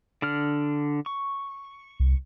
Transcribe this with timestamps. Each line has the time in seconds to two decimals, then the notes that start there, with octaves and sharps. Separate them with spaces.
0.22 D3 D4 F6
1.06 C#6
2.00 C2